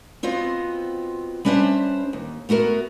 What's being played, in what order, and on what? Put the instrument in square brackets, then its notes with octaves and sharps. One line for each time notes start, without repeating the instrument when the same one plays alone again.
[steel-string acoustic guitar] B3 C4 F4 F#4 D#5
G3 C#4 D4 B4 C5 E5
D#2
A3 B3 F#4 A#4